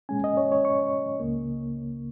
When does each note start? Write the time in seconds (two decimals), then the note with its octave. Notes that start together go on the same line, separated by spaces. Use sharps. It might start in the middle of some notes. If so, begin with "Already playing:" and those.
0.09 A#2 G#3 C#4 G#5
0.24 D#5
0.37 C#5
0.52 C#5
0.65 C#6
1.20 C#2 C#3 A#3